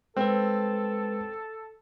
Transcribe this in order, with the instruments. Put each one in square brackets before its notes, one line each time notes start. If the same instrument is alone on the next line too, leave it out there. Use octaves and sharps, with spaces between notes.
[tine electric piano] G#3 B4 [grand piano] C4 [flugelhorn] A4